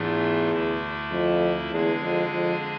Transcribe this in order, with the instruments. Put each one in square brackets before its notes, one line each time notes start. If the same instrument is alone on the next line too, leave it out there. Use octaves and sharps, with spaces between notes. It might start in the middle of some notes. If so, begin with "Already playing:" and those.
Already playing: [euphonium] E2 [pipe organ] G#2 E3 A3 D4 F4
[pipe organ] D2 D3 A3 E4
[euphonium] F2
[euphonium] E2 [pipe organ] D3 G#3 D4 G#4
[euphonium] F2
F2